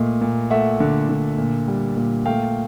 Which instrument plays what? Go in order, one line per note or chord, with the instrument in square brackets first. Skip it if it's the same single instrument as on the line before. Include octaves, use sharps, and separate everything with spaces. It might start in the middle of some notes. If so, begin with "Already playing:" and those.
Already playing: [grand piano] A#2 A3 D#5 F5
A#2
A3 E5 F#5
D3
D3
A#2
G3
A#2
A3 F5 G5